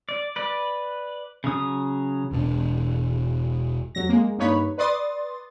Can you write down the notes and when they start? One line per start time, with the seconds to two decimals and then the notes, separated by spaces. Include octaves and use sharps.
0.09 D5
0.36 B4 D5
1.44 C#3 F#3 D#6
2.31 E1 B2 D4
3.95 F2 F#3 A#6
4.09 G#3 A#3
4.38 G2 A#3 D#4 B4 C#5 B5
4.78 B4 D5 C6 D#6 A6